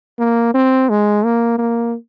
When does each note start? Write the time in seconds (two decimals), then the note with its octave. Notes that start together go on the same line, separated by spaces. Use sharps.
0.19 A#3
0.54 C4
0.89 G#3
1.24 A#3
1.58 A#3